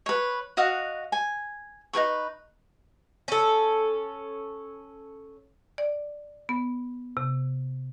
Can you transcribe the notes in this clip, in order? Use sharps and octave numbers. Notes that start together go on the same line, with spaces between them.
B4 C#5
F#4 D#5 F5 F#5
G#5
D#4 G#4 B4 C#6
C#4 A4
D5
B3
C3